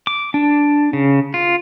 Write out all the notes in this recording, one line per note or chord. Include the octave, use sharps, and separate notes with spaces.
D6
D4
C#3
F4